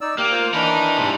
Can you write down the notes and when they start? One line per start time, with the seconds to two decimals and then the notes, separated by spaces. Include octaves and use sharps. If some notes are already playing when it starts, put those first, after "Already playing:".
0.01 D#4 D5 E6
0.18 A#3 G4
0.31 F4 C5
0.54 E3 D4 D#4 A#4 B5
0.98 G#2 C3